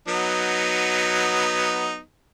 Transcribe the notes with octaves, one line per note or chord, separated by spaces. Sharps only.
F#3 B3 D#4